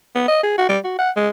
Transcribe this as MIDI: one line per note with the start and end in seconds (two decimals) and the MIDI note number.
0.15 0.26 59
0.28 0.40 75
0.43 0.54 68
0.58 0.67 66
0.69 0.79 55
0.84 0.94 66
0.99 1.10 78
1.16 1.29 56